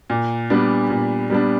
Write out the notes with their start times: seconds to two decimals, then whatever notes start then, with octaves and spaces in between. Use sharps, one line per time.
0.10 A#2
0.50 G3 B3 D4
0.90 A#2
1.30 G3 B3 D4